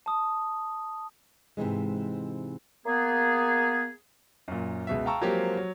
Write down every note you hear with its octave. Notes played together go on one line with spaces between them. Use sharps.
A5 D#6
G#2 C3 E3 G#3
A#3 B3 G#4
F#2 A#2
C#2 B2 E5
F5 G5 A5 A#5 C#6 E6
F3 F#3 G#3 A#3 C4 G4
F#3